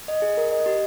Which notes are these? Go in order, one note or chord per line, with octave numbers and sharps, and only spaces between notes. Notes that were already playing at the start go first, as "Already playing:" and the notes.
D#5
G#4
A#4
D#5
G4